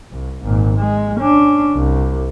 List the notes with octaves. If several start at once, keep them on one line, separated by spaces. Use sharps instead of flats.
C2
G#1 A#2
G#3
C#4 D4
C2